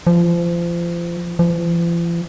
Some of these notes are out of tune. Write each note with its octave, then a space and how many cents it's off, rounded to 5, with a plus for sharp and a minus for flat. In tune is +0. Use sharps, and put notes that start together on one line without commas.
F3 -30
F3 -45